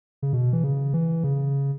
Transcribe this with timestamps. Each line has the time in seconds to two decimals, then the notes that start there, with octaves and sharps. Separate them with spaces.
0.22 C#3
0.33 B2
0.53 E3
0.64 C#3
0.94 E3
1.24 C#3